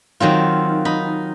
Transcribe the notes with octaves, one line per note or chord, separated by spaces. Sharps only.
D#3 F#3 C4 F4
D#4 B5